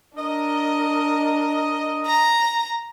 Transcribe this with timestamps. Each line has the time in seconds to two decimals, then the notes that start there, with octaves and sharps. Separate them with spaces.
0.18 D4 A#4 D#5
2.07 A#5